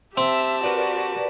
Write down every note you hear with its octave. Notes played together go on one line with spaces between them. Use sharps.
C4 G4 E5 A5
F#4 A#4 B4 D5